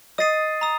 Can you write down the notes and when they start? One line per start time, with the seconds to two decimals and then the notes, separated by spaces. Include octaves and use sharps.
0.18 D#5 D#6 A6 C7 D#7
0.61 A#5 D#6